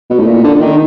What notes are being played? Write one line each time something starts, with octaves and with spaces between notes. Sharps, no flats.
B2
A2
A#2
D3
D3
D#3